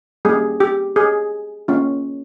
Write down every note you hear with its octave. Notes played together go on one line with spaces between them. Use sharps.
G3 A#3 C#4 E4 G4 G#4
G4
G#4
A#3 C#4 F4